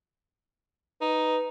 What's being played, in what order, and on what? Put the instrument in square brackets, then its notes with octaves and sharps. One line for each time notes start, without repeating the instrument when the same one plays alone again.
[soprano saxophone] D#4 [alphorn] B4